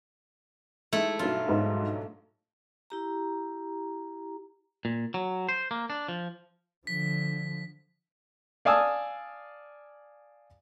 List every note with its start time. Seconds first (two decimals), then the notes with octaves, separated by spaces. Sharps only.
0.93 G#3 A3 D#4 E4
1.19 B1 G2 F#3 F4
1.49 G#2
2.90 E4 G4 A#5
4.85 A#2
5.14 F#3
5.49 C5
5.71 A#3
5.90 D4
6.08 F3
6.87 D3 F3 B6
8.65 D5 F5 G#5 A5 D#6 E6